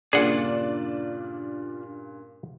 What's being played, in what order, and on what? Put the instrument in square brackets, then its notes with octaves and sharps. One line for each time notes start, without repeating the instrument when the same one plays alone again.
[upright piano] G2 A#2 C#3 [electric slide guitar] D4 F4 [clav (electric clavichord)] G#4 F#5 [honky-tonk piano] D5